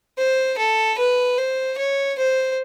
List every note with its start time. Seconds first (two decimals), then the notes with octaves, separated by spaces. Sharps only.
0.18 C5
0.58 A4
0.99 B4
1.38 C5
1.78 C#5
2.18 C5